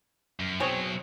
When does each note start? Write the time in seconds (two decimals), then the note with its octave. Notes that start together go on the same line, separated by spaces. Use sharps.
0.40 F#2
0.60 B2 F#3 C4 G#4 C#5